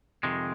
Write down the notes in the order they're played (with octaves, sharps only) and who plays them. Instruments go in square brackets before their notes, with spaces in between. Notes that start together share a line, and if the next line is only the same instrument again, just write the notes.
[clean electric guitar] F2 C3 D#3 G#3